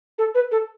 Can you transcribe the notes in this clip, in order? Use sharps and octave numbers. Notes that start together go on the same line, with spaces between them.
A4
B4
A4